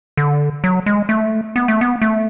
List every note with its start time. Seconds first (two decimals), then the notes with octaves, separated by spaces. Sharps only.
0.17 D3
0.64 F#3
0.86 G#3
1.09 A3
1.56 B3
1.68 A3
1.81 B3
2.02 A3